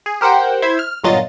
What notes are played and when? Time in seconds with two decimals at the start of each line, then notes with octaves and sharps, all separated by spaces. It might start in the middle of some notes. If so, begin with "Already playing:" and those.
0.06 G#4
0.21 G4 A#4 C5 F#5 G5
0.62 E4 C5 E5 G#6
0.79 F6
1.04 G1 A#2 F#3 F4 D#5 A6